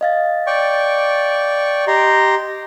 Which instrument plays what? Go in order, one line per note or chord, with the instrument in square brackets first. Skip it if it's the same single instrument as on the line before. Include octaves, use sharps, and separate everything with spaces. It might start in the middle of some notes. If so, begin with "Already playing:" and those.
[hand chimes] D#5 F5 A6
[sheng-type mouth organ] D5 G5 C#6
[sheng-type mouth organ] G4 A#5 C6 [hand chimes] D#5